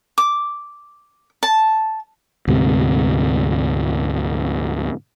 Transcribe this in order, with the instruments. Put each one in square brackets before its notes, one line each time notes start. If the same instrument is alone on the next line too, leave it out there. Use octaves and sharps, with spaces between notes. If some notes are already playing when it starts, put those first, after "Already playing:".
[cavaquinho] D6
A5
[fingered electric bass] D2 G#2 C3